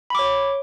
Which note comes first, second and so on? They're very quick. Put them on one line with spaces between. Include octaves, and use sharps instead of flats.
B5 D6 C#5